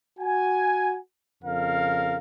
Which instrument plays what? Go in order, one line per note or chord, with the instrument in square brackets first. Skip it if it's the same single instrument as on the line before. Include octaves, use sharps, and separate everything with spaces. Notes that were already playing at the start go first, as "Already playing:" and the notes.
[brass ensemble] F#4 G#5
F2 C#3 A#4 F5